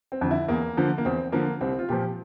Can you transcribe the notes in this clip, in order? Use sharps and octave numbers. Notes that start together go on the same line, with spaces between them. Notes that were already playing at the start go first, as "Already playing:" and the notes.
C4
F2 D3
E4
E2 A#3
D3 F3
A#3
E2 C4
D3 F3 A#3
C2 C4
F4
A#2 F3 G4